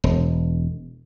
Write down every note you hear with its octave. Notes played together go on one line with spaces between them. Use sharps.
E1